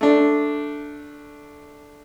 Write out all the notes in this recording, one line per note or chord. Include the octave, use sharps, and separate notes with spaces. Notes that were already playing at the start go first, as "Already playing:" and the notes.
A3 D4